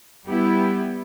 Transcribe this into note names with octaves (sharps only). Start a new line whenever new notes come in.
G3 B3 E4 G4